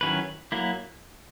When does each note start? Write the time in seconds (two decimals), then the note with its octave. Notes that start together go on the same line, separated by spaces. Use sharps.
0.01 D#3 F#3 C#4 E4 B4
0.52 F#3 A#3 E4